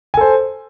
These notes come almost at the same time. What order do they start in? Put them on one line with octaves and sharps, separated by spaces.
G#5 A4 C5